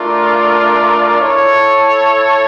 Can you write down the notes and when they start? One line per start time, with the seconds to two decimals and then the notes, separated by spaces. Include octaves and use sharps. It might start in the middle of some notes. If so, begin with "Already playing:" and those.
Already playing: A3 D4 F4 A#4 D5
1.16 E4 A4 C#5